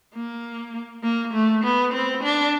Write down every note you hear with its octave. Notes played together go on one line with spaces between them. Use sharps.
A#3
A#3
A3
B3
C4
D4